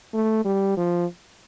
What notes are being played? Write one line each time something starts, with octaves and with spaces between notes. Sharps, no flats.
A3
G3
F3